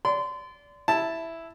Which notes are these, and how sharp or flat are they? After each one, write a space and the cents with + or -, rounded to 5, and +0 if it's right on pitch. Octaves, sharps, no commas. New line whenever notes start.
D5 -25 C6 -30
E4 +0 A5 +0